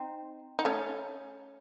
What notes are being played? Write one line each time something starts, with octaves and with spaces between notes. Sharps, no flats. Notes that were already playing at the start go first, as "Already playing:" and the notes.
Already playing: C4 D#4
D#4
A3 C#4